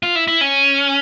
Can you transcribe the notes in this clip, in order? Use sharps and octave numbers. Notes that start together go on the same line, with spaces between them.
F4
E4
E4
C#4